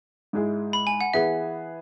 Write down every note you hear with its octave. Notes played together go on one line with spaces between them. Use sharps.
G#2 G#3 E4 G#4
B5
G#5
F#5
E3 B3 G#4 E5